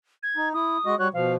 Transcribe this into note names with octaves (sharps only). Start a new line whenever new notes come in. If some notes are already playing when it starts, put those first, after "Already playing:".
G#6
D#4
E4 D#6
G#3 F#4 D#5
G3 F#4 C#5 F#6
B2 F3 F5